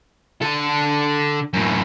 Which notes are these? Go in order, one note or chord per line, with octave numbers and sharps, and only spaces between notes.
D3 A4
F#2 A2